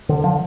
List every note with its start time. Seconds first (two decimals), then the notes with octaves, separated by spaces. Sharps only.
0.09 D3
0.24 F3